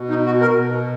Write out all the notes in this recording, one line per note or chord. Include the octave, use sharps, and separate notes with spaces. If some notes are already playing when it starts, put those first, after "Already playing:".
Already playing: B2
D#4
F#4
A#4
B2